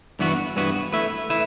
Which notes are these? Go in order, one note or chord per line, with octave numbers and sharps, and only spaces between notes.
G2 E3 B3 F#4
G2 E3 B3 F#4
A3 E4 B4 E5
A3 E4 B4 E5